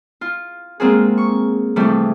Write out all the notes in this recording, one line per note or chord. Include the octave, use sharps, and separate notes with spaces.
F4
G#3 A#3 C4 F4 F#4 G#4
C#6
C3 E3 F3 G3 A3